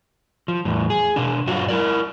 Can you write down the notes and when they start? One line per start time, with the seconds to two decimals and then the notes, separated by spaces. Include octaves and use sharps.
0.48 F3
0.65 E2 A2
0.90 G#4
1.16 B2 D4
1.47 G2 F#3 F4 F#4
1.68 E4 A#4 D5